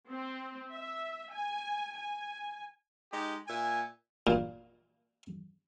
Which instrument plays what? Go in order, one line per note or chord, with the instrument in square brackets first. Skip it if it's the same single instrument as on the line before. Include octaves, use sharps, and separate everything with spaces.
[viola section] C4
E5
G#5
G#5
[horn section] G#3 D#4 G4
A#2 E5 G#5
[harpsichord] A#2